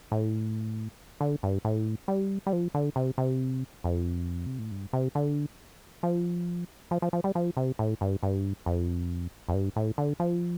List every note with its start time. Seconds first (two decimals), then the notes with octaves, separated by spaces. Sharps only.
0.12 A2
1.21 D3
1.43 G2
1.65 A2
2.08 G3
2.46 G3
2.53 F3
2.74 D3
2.96 C3
3.18 C3
3.84 F2
4.46 C3
4.59 A2
4.71 G2
4.93 C3
5.15 D3
6.03 F3
6.91 F3
7.02 F3
7.13 F3
7.24 G3
7.35 F3
7.57 C3
7.79 A2
8.01 G2
8.23 G2
8.66 F2
9.49 F2
9.54 G2
9.76 A2
9.98 D3
10.20 F3